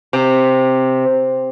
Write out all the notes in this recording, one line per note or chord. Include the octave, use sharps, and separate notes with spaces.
C3